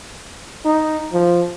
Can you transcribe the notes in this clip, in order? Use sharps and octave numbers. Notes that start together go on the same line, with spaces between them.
D#4
F3